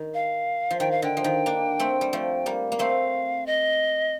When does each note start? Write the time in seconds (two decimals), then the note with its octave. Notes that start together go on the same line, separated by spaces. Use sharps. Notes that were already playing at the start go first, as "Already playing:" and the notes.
Already playing: D#3
0.14 F5
0.71 F3
0.80 D#3 G5
0.91 F5
1.02 D3 G5
1.17 F3
1.24 D#3
1.46 A#3 D4
1.79 A3 C4
2.01 G3
2.13 F3 A3
2.46 G3 A#3
2.72 A#3
2.79 A3 C4 F5
3.46 D#5